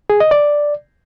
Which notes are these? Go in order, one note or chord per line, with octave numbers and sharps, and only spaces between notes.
G#4
D#5
D5